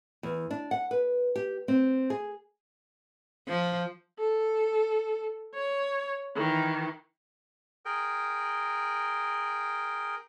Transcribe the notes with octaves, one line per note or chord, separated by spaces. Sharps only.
E2
D4
F#5
B4
G4
C4
G#4
F3
A4
C#5
D#3 E3
G#4 A#4 G5